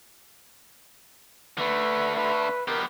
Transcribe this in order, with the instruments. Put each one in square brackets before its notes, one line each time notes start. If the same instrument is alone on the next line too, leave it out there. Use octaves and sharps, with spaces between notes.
[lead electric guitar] D3 A3 [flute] B4
[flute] B4
[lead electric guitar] B3 G4 [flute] A#4